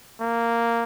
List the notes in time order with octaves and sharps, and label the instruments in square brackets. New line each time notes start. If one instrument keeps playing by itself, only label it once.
[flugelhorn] A#3